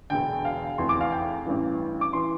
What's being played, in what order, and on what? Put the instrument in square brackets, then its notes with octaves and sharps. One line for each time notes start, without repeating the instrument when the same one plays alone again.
[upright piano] E1 E2 D3 G5
F5
F1 E2 E3 C6
D6
F5
G5
A1 G2 E3
D6
E3 C6